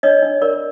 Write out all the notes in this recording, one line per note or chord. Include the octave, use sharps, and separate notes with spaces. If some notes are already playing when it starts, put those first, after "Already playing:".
D4 C#5 D#5
D4
A#4 D5